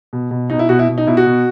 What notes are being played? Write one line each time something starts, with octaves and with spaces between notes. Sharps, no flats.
B2
B2
B2 D#4
E4
B2 F#4
E4
B2
D#4
B2 E4
F#4
B2